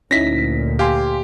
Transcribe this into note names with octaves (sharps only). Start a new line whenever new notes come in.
D2 A#2 C#4 D#4 E4 A#6 B6
G4 F5 G#5 C6